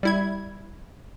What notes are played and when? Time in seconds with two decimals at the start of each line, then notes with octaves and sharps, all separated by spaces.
0.03 G3 E4 G#6